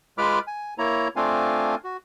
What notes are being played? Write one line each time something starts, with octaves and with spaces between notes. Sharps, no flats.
G#3 F4 B4 B5 D6 F6
G#5
A#3 E4 C#5 A#5
A3 C4 D4 F4 F5 G#5
F#4